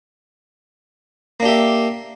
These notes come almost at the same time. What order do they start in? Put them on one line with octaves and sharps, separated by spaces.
A#3 D4 G4 E5